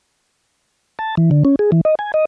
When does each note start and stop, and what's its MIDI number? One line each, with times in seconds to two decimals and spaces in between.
0.99 1.15 81
1.17 1.30 52
1.31 1.43 50
1.45 1.56 61
1.59 1.71 68
1.72 1.81 52
1.85 1.95 75
1.99 2.12 80
2.14 2.25 75